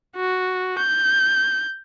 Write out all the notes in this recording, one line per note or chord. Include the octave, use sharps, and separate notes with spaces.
F#4
G6